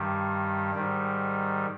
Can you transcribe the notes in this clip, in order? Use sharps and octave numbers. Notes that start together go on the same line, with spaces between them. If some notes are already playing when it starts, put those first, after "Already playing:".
Already playing: G2 D#3 G3
G#2 D#3 G3